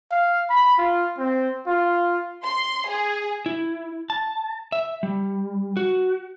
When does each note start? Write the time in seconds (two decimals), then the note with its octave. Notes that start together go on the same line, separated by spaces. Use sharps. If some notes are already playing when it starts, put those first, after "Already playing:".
0.11 F5
0.50 B5
0.78 F4
1.18 C4
1.67 F4
2.44 C6
2.89 G#4
3.46 E4
4.10 A5
4.72 E5
5.03 G3
5.77 F#4